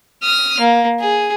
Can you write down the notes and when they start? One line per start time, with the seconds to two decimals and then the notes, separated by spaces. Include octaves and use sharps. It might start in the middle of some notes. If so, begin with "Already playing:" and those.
0.24 D#6 F6
0.60 A#3
1.00 G#4